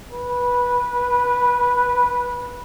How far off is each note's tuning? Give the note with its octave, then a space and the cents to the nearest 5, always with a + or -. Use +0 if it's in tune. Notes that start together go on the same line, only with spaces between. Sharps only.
B4 -15